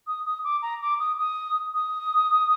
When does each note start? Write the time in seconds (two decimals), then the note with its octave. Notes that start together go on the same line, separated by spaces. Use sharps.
0.07 D#6
0.26 D#6
0.44 D6
0.62 A#5
0.82 D6
1.00 D#6
1.18 D#6
1.74 D#6